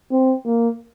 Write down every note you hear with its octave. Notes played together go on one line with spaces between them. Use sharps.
C4
A#3